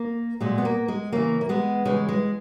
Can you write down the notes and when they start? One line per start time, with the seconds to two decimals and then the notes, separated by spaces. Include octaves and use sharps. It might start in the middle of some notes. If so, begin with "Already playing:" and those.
Already playing: A#3
0.41 A#2 F#3 G#3
0.58 B3
0.65 A#3
0.88 G#3
1.12 C#3 E3 A#3
1.41 A#3
1.49 G#3 B3
1.85 C#3 E3 G#3
2.09 G#3